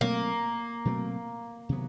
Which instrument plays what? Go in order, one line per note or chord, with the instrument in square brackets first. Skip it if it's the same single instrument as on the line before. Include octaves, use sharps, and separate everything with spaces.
[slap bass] B2 F#3 A3 C4 [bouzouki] A#3
[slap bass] B2 F#3 A3 C4
C3 D#3 F#3 B3